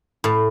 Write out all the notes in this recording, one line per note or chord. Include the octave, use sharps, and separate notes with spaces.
A2